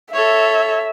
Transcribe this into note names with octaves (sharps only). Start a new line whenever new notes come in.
A4 C#5 E5